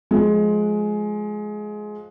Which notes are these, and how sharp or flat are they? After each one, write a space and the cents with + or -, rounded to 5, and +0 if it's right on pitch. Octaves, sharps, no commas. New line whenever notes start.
F3 +20 G#3 +20